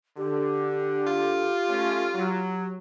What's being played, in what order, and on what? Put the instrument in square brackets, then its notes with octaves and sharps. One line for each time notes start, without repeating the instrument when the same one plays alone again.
[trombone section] D3 [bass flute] G4
[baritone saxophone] F4
[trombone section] A3 C#4
F#3